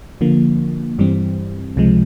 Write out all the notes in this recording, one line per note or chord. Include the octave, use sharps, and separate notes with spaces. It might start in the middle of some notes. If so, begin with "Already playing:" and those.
D3 F3 A#3
G2 E3 G3 C4
C#2 C3 F3 G#3